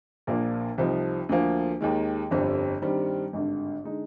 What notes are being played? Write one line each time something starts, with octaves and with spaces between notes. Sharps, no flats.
A#1 A#2 F3 A#3 D4
C2 C3 F3 C4 D#4
D2 D3 F3 A#3
D#2 D#3 G#3
G1 F2 D3 G3 C4
G2 D#3 G3 C4
G#1 G2 D3
D3 G#3 D#4